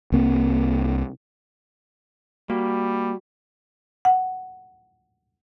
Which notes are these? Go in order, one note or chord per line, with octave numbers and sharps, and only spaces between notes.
C2 A#3 C4
G3 A#3 F#4
F#5